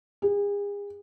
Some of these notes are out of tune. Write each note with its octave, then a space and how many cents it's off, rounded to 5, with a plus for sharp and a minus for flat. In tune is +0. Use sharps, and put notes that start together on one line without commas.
G#4 -40